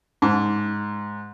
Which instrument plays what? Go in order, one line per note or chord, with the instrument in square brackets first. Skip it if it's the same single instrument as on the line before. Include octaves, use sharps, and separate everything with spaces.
[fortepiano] G#2